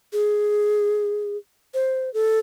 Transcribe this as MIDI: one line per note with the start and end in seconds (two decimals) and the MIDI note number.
0.13 1.37 68
1.74 2.12 72
2.14 2.39 69